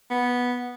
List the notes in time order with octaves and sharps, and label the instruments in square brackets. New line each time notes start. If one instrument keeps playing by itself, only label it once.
[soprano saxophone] B3